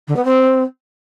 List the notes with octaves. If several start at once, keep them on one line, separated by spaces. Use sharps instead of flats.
D3
B3
C4